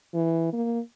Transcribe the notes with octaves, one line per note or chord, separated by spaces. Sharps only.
E3
A#3